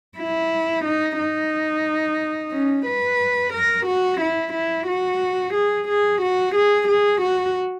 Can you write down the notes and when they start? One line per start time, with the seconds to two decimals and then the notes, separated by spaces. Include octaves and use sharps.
0.18 E4
0.85 D#4
1.19 D#4
2.53 C#4
2.86 B4
3.53 A#4
3.86 F#4
4.21 E4
4.53 E4
4.87 F#4
5.54 G#4
5.88 G#4
6.22 F#4
6.55 G#4
6.88 G#4
7.21 F#4